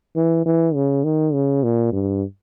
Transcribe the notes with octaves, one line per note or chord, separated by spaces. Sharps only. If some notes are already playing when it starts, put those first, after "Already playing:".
E3
E3
C#3
D#3
C#3
A#2
G2